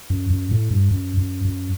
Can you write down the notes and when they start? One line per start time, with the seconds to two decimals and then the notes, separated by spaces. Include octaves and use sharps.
0.10 F#2
0.30 F#2
0.51 A2
0.71 G2
0.91 F#2
1.17 F#2
1.45 F#2